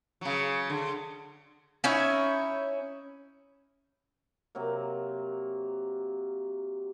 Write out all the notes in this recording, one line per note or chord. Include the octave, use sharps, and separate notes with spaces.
C#3 F#3
D3
C#4 D#4 E4 C#5
C3 F#3 A#3